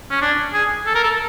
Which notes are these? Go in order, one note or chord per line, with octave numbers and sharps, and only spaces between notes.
C#4
D4
G#4
A4
A#4
A4